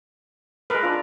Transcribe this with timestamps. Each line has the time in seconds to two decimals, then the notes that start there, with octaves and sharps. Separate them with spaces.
0.70 G#3 A#4 B4 E6
0.83 D4 F4